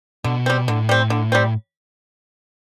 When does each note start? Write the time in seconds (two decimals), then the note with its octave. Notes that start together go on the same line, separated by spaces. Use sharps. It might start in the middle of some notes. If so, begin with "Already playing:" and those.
0.24 B2 D3
0.46 G3 C4
0.68 A2 D3
0.89 G3 C4
1.10 D3
1.32 G3 C4